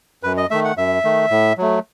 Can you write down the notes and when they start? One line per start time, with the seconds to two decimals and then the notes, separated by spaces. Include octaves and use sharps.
0.23 F#2 B4
0.37 D#5
0.51 D#3 A3 E5
0.65 F#5
0.77 F#2 E5
1.04 D#3 A3
1.31 A2
1.58 F#3 A3